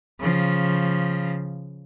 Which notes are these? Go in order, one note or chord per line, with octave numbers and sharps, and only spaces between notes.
C#3 F3